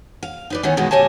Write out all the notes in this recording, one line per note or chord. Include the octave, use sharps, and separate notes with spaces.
F5
D#4 B4 D5
D#3 E3 B3 C#4
G2 B2 D#3 G#3 B3
D2 G4 C#5 D#5 G#5 A5